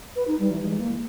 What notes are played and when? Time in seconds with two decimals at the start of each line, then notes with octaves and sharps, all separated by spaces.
0.16 B4
0.28 D#4
0.39 G3
0.51 E3
0.63 G#3
0.78 A#3